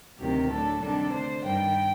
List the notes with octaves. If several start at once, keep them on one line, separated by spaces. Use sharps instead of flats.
D2 C3 D#3 F#3 C4 G4
A2 F#3 A3 D4 A4
C3 D#3 G3 D4 A4
D3 A3 D4 C5
G2 D#3 G3 G5